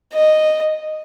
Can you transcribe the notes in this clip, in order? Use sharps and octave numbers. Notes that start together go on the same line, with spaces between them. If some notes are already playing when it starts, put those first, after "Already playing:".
D#5